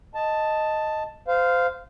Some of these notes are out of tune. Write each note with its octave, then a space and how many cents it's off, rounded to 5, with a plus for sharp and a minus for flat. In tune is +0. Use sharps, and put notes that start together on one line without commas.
D#5 +0 A5 +0
C5 -25 F5 +0